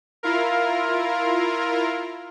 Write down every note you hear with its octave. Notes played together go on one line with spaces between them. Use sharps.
E4 F4 A#4